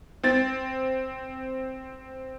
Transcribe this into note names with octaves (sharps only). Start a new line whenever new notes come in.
C4 A6